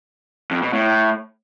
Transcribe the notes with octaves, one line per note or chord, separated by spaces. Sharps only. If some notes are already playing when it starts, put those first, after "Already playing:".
F2
B2
A2